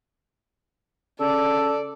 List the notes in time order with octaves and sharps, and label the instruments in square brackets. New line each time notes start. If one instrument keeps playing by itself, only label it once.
[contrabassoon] C#3 [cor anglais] A4 [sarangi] D5